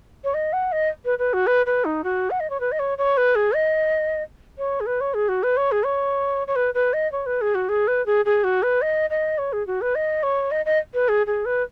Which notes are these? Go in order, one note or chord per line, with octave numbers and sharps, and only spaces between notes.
C#5
D#5
F#5
D#5
B4
B4
F#4
B4
B4
D#4
F#4
F#5
D#5
C#5
B4
D#5
C#5
C#5
B4
G#4
D#5
C#5
G#4
B4
C#5
G#4
F#4
B4
C#5
G#4
C#5
C#5
B4
B4
D#5
C#5
B4
G#4
F#4
G#4
B4
G#4
G#4
F#4
B4
D#5
D#5
C#5
G#4
F#4
B4
D#5
C#5
D#5
D#5
B4
G#4
G#4
B4